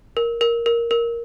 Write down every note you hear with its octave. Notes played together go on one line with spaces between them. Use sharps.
A#4
A#4
A#4
A#4